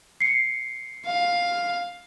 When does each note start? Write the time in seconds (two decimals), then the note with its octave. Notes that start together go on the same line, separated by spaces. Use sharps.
0.20 C7 C#7
1.06 F5